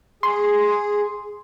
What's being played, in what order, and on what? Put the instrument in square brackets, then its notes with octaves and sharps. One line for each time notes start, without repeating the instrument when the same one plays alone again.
[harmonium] G#4 [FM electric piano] C6